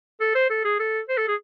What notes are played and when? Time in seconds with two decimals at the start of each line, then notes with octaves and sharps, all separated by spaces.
0.20 A4
0.35 C5
0.50 A4
0.65 G#4
0.79 A4
1.09 C5
1.18 A4
1.28 G#4